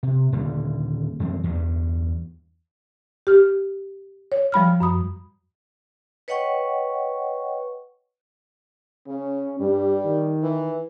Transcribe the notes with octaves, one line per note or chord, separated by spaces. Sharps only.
C3
D#1 A#2 D3 G3
F#2 E3 G3 C4
E2 G2
G4 F6
C#5
F3 G3 B5 F6
F#2 B5 D#6
B4 C#5 D#5 F#5 G5 C#6
C#3 C#4
G2 G3
D#3
E3